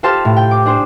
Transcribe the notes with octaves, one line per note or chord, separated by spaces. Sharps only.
F4 G4 A4 C5 A5 F6
A2
G5
D6
D4 G#4 C5